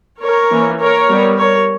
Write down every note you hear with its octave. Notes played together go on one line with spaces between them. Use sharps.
A#4 C#5
E3 A#3 C#4
A#4 C#5
G3 B3
A#4 C#5